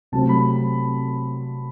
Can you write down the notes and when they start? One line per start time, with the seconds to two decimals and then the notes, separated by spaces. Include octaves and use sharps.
0.12 C3 F#3 A3 C4 A5
0.29 B5